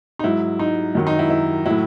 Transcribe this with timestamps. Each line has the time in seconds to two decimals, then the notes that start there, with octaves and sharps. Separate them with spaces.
0.19 D#4
0.24 G#2 F#3 E4
0.59 D#4
0.95 F#2 D#3 F#3
1.07 D#4
1.19 E4
1.30 E4
1.66 A2 F#3 E4